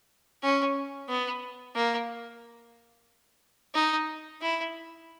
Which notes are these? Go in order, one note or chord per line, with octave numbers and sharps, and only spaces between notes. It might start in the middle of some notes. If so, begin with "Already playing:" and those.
C#4
B3
A#3
D#4
E4